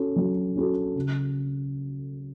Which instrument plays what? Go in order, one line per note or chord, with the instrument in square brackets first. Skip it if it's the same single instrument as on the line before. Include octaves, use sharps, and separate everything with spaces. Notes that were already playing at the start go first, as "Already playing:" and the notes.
Already playing: [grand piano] C#4 F#4 A4
F#3
C#4 F#4 A4
C#3